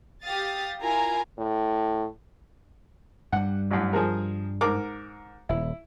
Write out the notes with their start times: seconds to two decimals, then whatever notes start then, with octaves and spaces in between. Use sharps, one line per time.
0.22 G4 F5 D#6 A6
0.80 E4 F4 A#4 G#5 A#5
1.38 A2
3.32 G2 G3 F#5
3.71 A1 F#2
3.93 F3 G#4 A#4
4.61 G#2 A#4 D6
5.49 D#1 E4